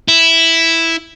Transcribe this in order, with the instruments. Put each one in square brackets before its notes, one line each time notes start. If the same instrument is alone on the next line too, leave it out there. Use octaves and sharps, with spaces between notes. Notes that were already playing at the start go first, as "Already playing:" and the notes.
[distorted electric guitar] E4